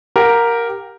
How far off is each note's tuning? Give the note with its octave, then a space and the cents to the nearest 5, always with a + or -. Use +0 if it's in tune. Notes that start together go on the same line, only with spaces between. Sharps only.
G4 +0 A#4 +0 F#5 -45